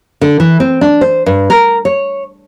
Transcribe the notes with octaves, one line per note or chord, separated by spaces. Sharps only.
D3
E3
C4
D4
C5
G2
A#4
C#5